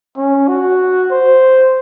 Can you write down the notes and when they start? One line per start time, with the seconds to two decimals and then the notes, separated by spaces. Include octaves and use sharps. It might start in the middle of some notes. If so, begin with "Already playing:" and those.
0.17 C#4
0.48 F#4
1.11 C5